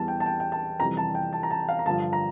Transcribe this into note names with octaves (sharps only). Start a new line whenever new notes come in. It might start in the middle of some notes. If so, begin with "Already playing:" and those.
Already playing: E2 E3 G3 A5
G5
A5
G5
G5
A5
F2 C3 E3 G3 A#5
A5
G5
A5
A#5
A5
F5
A#5
G2 D3 F3 A5
A#5